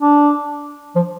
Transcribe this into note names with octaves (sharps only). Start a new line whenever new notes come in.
D4
F3